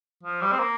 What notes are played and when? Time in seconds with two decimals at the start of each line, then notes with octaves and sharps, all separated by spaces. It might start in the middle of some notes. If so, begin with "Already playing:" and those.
0.24 F3
0.41 G3
0.52 C4
0.59 A#3